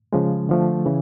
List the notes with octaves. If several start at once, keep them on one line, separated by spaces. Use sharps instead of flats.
C#3 F3 G#3
D3 F3 A3
C#3 E3